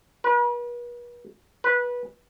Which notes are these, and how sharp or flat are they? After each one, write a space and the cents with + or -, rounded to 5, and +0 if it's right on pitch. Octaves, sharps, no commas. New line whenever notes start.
B4 -40
B4 -15